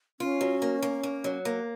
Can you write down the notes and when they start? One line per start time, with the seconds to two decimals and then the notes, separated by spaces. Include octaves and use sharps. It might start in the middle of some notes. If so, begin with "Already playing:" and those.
0.20 C#4 F4
0.41 F#3
0.62 A#3
0.82 A#3
1.03 A#3
1.24 F#3
1.45 A#3